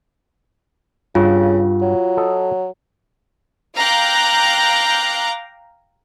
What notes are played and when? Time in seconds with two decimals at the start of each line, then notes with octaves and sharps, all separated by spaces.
1.15 G2 C#3 F4 F#4
1.82 F#3
2.17 A4 D#5
3.76 F5 G5 A#5 D6 F#6 G6